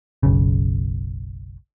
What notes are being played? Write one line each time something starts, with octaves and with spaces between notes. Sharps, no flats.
F#1 B1 C#3